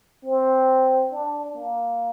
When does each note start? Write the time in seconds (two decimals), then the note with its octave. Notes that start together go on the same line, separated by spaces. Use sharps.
0.24 C4
1.12 D4
1.55 A#3